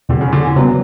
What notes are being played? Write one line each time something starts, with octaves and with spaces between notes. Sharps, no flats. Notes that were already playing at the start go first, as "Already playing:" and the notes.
E2 B2 D3 G3
C#3
D3
E3
C#3 F#3 G3 B3